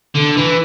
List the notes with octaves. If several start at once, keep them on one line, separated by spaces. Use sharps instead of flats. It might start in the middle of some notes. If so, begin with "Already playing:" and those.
D3
E3